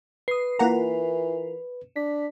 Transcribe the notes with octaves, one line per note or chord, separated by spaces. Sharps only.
B4 D#6 C7
E3 A#3 E4 F4 A#4 F#5 A#5
D4 B6